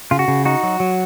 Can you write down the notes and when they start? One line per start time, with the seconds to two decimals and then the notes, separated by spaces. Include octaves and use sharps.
0.11 C#3 F4
0.19 F#4
0.28 C#3
0.45 D#4 F#4
0.63 F#3
0.80 F#3